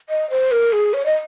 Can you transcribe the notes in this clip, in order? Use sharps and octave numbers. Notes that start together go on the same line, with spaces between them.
D#5
C5
A#4
G#4
C#5
D#5